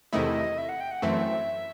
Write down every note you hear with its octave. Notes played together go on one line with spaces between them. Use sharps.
E2 C3 D#3 A3 E4 D#5
E5
F#5
G5
F#5
F#2 E3 A3 C4 E5